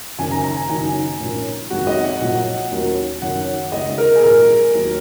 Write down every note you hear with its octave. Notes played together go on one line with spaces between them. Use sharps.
F#1 F#2 D#3 G#5
A#5
A#5
G#5
F#1 F#2 D#3 F#3 D#4 G#5
A#1 G#2 G#3 C#4 A#4
G#1 F#2 D#3 G#3 C#4 F#4
D#5
F#5
A#1 A#2 F#3 F#5
D#2 D#3 F#3 C#4 F#4
F#2 D#3 F#3 C#4 F#5
C#2 C#3 G#3 D#4 F#4 D#5
A#4
G#4
A#1 G#2 F#3 A#4
D#2 D#3 F#3 A#3 F#4